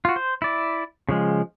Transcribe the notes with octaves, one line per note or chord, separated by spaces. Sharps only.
F4 F#4
C5
E4 D5
C#3 F3 G#3